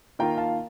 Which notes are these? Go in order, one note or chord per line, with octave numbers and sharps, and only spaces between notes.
D#3 A#3 F4 G5 A#5
F5 A5